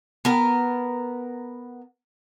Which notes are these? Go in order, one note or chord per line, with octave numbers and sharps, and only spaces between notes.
B3 A#4